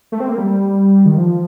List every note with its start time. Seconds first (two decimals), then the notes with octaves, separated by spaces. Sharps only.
0.12 A3
0.20 C4
0.29 A#3
0.38 G3
1.06 D#3
1.17 F3